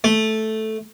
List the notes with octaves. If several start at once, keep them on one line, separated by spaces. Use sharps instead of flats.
A3